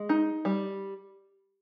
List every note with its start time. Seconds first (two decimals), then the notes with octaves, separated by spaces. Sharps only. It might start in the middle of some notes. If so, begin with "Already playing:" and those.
Already playing: G#3
0.09 D#4
0.45 G3